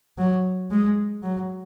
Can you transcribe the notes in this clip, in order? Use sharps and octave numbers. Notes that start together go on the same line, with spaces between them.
F#3
G#3
F#3